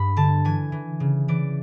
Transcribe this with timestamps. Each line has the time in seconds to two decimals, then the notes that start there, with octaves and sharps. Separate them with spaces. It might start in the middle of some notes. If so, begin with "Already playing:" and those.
Already playing: G2 B5
0.17 D3 A5
0.45 E3 G#5
0.72 E3
1.00 C#3
1.28 E3 D5